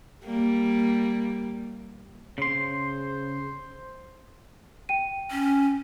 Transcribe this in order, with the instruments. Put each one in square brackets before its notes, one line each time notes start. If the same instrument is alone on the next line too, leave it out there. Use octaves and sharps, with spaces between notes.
[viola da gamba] G3 A#3
[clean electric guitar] C#3 C6 [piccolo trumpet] C5
[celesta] G5 D#7
[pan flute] C#4